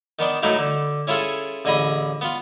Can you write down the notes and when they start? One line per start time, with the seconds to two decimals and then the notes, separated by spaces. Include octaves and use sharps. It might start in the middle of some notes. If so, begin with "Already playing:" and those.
0.19 D#3 B3 D4
0.43 A2 F#3 A3 D#4 E4 F5
0.59 D3
1.07 C#4 E4 F4 G#4 A4
1.65 A1 D3 G#4 D#5 B5 D#6
2.21 B3 F4